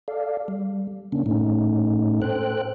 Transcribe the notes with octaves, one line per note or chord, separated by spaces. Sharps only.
A4 D5 F5
G3
C#3 A#3 C#4 D4
A2 A3 C#4 D#4
A4 C5 G5 F#6